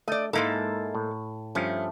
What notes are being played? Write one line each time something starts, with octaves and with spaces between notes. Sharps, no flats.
A3 D5 D#5
G#2 G#3 A#3 D#4 E4 A4
A2
G2 F3 A3 C#4